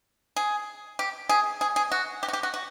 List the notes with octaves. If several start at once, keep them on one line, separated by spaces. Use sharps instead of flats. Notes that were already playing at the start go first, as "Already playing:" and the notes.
G#4
G4
G#4
G#4
G#4
F#4
G4
F#4
G4
F#4
F#4